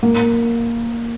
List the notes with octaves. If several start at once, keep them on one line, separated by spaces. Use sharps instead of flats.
A#3